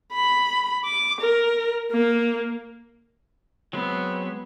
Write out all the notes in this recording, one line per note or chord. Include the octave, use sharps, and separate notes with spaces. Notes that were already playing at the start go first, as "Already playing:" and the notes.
B5
D6
A#4
A#3
F#3 G#3 B3 C4